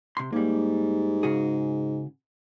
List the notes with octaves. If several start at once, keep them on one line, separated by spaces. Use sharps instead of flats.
C3 C6
G#2 G3 A#3
C#3 F#4 G#4